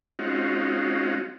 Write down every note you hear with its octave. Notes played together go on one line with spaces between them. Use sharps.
G#3 C4 C#4 D#4 F4 F#4